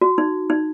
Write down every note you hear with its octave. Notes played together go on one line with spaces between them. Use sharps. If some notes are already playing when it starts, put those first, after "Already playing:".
F#4
D#4
D#4